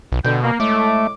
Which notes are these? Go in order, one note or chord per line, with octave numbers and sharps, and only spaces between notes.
B1
B2 D3 G5
A#3
A2 G#3 A3 D6